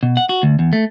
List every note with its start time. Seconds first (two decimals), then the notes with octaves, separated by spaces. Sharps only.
0.03 B2
0.17 F#5
0.29 F#4
0.43 D2
0.59 E2
0.73 A3